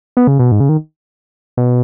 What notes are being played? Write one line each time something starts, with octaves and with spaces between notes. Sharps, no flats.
B3
C#3
B2
G#2
C#3
D#3
B2